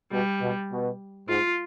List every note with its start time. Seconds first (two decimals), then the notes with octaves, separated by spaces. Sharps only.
0.12 B2 G3
0.41 B2
0.71 B2
1.29 G#2 F4